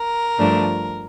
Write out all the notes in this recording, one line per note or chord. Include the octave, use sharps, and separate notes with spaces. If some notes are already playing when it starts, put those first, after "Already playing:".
Already playing: A#4
G2 F3 A3 D4